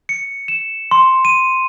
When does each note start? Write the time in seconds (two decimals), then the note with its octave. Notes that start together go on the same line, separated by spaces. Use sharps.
0.09 C#7
0.48 E7
0.91 C6
1.25 D#7